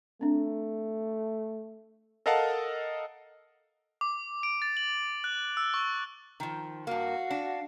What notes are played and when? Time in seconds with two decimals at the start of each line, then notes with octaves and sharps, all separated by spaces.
0.21 A3 C4 D4
2.26 A4 A#4 D#5 F5 F#5 A5
4.01 D6
4.43 D7
4.62 A6
4.77 F#7
5.24 F#6
5.57 E6
5.74 C#6
6.40 D#3 F3
6.87 G2 A#3 F#4 F5
7.31 D4